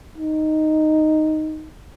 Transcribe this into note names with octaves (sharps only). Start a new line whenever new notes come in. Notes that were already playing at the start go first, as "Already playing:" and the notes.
D#4